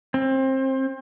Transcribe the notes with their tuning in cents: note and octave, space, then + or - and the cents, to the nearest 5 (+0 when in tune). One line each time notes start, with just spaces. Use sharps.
C4 +25